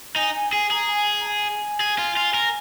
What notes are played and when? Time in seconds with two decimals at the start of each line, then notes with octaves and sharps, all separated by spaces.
0.16 D#4 G#5
0.35 G#5
0.52 G#4 G#5
0.70 G#4 A#5
0.89 G#5
1.21 A#5
1.26 G#5
1.80 G#4
1.98 F4
2.17 F4
2.34 A#4